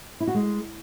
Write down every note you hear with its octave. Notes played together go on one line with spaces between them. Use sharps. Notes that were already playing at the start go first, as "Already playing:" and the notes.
E4
F#4
G#3